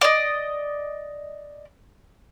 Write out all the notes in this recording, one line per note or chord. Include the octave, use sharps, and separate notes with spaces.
D5 D#5